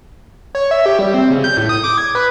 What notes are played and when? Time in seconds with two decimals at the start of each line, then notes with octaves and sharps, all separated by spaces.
0.55 C#5
0.71 E5
0.86 G4
0.99 G3
1.14 C4
1.31 C#3
1.44 G6
1.57 A2
1.69 D#6
1.84 D6
1.98 G#6
2.15 B4